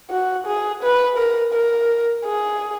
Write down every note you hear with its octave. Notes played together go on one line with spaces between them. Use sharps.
F#4
G#4
B4
A#4
A#4
G#4